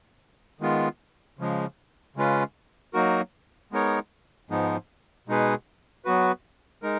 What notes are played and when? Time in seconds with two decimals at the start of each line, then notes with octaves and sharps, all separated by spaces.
0.61 D#3 G#3 B3 F4
1.39 C#3 F3 G#3
2.16 C#3 G#3 C#4 F4 B4
2.94 F#3 A#3 D#4 F#4 A#4
3.72 G#3 B3 D#4 A#4 C#5
4.50 G#2 F3 G#3 B3 D#4
5.28 B2 G#3 D#4 G#4 B4
6.05 F#3 B3 F#4 B4
6.82 G#3 D#4 A#4